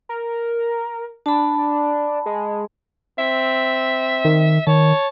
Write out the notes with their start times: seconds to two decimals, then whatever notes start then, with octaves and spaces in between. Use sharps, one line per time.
0.09 A#4
1.26 D4 A5 B5
2.26 G#3
3.19 C4 E5
4.25 D#3
4.67 D#3 C#5 A5